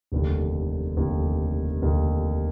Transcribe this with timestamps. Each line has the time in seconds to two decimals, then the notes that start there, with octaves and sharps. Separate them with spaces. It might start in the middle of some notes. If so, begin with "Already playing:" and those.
0.12 F1 D#2 D3
0.97 F1 D#2 D3
1.82 F1 D#2 D3